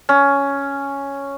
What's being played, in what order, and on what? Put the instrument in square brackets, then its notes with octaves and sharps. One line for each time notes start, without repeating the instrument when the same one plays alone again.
[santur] C#4